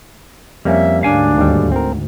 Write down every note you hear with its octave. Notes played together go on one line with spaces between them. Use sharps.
F2 G3 A#3 C#4 E5
D2 G#2 D4 F5 G#5
D#2 G3
C4 A#4